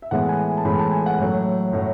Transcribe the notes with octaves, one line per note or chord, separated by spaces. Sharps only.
E5
A2 E3 G#3 B3 F#5
G#5
A5
A2 E3 G#3 B3 B5
A5
G#5
F#5
A2 F#3 A3
A2 F#3 A3